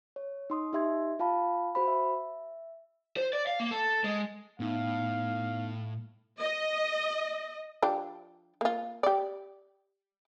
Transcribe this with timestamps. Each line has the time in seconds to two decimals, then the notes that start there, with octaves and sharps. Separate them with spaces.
0.16 C#5
0.50 D#4 C6 D#6
0.73 D#4 G4 E5 C6 G#6
1.19 F4 F5 A5 B5
1.75 F#4 C5 B5
1.87 E5
3.17 C5
3.33 D5
3.47 F5
3.60 A#3
3.71 A4
4.04 G#3
4.60 A2 B3 D#4 F5
6.40 D#5
7.82 F3 D4 G4
8.61 A#3 F4
9.03 G4 D5